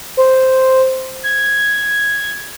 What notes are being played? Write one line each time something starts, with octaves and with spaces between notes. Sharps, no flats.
C5
G#6